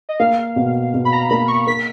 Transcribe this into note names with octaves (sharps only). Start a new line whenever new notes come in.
D#5
A#3 F5
B2
B2
B5
A#5
A#3 B5
C#6
A#4 B6